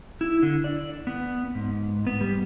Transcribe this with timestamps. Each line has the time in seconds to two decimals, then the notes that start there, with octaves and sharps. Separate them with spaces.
0.21 E4
0.43 D3
0.64 D5
1.07 B3
1.55 G#2
2.07 B3
2.21 G3